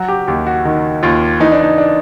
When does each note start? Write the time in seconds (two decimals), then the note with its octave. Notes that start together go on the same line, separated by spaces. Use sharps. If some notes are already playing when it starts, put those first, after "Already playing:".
Already playing: F#3 F#4
0.08 G4
0.27 D#2 G4
0.47 F#4
0.65 D#3
1.03 D#2 F4
1.40 E3 D#4
1.52 D4
1.62 D#4
1.78 D4